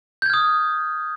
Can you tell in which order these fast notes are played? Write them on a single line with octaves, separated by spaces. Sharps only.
G6 G#6 F6 D#6